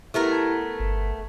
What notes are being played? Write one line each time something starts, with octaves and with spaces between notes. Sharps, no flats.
A3 B3 E4 G4 A#4
A5 G#6
G1